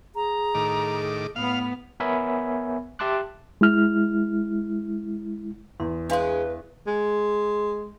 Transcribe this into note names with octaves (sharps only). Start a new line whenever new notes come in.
G#4 A#5
A2 D#3 D6
A2 B3 F5 F7
B3 A#4 C#5 E5 G#5 B5
G4 E5 A5 C6 D6 F#6
G#3 E4 F6
E2 C6
G#3 C#4 D4 B4 F5 C6
G#3